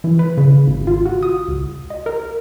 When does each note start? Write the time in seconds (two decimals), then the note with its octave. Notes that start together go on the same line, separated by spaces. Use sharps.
0.04 E3
0.19 B4
0.38 C#3
0.67 G#1
0.87 F4
1.06 F#4
1.23 D#6
1.48 C#2
1.90 D#5
2.06 A#4